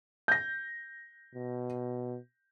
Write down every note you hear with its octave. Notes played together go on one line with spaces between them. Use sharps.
G6 A#6
B2